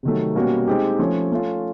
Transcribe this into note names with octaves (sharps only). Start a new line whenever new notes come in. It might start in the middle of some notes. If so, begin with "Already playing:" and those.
C3 D#3 F#3 A3
B2 G3 A#3 C#4 F#4
G#3 C4 D#4 G4
F3 A3 C#4
A3 C#4 F4